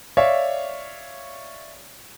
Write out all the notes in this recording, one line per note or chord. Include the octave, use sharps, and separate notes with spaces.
C#5 D5 E5 F5